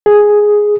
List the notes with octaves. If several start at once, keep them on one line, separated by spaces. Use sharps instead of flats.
G#4